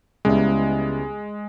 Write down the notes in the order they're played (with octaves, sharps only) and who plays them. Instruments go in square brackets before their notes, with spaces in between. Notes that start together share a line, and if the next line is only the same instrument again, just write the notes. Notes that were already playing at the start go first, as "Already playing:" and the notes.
[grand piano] C#2 C#3 G3 B3 E4 [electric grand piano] G#3